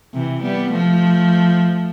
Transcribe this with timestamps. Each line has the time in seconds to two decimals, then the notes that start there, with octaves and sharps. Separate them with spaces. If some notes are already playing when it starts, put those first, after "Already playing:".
0.14 C3 E3
0.42 G3 B3
0.71 F3 A3